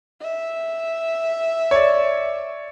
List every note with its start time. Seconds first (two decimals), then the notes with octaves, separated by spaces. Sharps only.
0.21 E5
1.71 C#5 D5